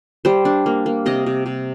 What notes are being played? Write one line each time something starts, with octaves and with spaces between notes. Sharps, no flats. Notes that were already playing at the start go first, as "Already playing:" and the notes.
G3 C5
D4
A#3
A#3
C3 D#5
C3
C3